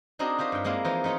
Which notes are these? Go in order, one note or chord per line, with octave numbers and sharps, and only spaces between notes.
C4 D4 D#4 F#4 G#4 A#4
F4 G4 A#4 C5
G2 G5
G#3 A#3 C4 E4 F4
E3 F3 D#4 F4 C5 D#5
A3 D#4 F4 A4 C#5